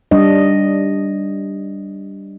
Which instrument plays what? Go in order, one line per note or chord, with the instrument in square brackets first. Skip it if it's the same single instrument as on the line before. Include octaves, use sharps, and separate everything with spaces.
[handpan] G3 D4 D#5